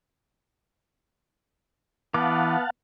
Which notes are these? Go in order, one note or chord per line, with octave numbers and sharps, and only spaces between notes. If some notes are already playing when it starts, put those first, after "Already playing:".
E3 B3 F5 F#5 A5 D6